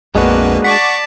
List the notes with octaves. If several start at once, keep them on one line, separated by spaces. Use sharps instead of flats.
A#1 F2 G#3 A#3 B3 D4 F#4 B4
D5 F#5 A5 C#6 D6 B6